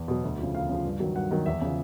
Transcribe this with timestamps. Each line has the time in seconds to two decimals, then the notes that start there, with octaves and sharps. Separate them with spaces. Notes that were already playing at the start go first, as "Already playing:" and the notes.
Already playing: E2
0.08 B2 F#3
0.24 D2
0.39 C#3 F3
0.54 D2 F5
0.69 C#3 F3
0.85 G2
1.00 D#3 F#3
1.15 G2 F#5
1.31 D#3 F#3
1.46 E2 E5
1.61 C#3 F3